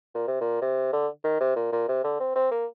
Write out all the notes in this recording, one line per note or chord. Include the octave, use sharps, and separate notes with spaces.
A#2
C3
A#2
C3
D3
D#3
C3
A#2
A#2
C3
D3
C4
C4
A#3